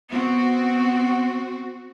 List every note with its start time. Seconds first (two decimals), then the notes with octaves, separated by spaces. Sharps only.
0.10 B3 C4 F#4